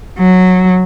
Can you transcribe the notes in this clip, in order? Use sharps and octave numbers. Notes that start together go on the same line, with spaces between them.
F#3